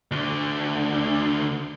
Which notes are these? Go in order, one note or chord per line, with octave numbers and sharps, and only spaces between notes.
D2 D3